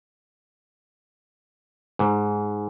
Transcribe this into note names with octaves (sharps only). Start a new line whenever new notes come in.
G#2